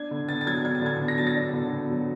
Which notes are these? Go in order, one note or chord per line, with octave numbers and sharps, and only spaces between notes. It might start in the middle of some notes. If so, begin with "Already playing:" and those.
Already playing: D4 G#6
D3
B3 A6
A6
F#3 G#6
D4 G#6
A6
D3 G#6
B3
A#6
F#3 A6
A#6
D4
D3
B3
F#3